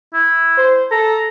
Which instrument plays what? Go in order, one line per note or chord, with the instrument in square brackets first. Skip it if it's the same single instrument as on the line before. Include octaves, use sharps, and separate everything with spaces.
[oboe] E4
[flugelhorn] C5
[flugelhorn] A4 [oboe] A#5